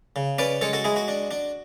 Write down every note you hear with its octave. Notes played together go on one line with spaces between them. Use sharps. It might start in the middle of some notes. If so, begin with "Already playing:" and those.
C#3
C#4 B4 D5
G#3 A4 C#5
F#4 A4
G#3 E4 G#4
F#4
D4
D4